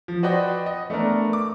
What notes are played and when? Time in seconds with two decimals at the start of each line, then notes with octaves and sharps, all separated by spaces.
0.08 F3
0.23 F#4 B4 C5 D5 D#5 G5
0.66 D#5
0.90 A3 B3 D4 A#4
1.33 D6